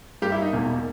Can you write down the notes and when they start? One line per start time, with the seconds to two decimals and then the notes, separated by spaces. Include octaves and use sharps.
0.22 G2 G3 A#3 G4
0.32 E4
0.42 D#4
0.53 E1 E2 B2 A#3